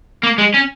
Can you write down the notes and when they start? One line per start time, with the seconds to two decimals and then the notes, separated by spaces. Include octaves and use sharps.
0.23 A#3
0.38 G#3
0.54 C#4